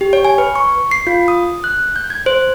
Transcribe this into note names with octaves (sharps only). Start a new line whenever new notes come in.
G4
C#5
G#5
B4
C#6
C7
F4
D#6
F#6
G6
G#6
C5